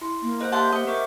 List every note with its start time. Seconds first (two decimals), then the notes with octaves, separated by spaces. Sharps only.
0.01 E4 C6
0.23 A#3
0.40 B4 C5 D#5 F#5
0.52 G4 E5 F#5 A5 C6 G6
0.72 C5 D#5 F#5
0.87 A#4 E5 C#6 D6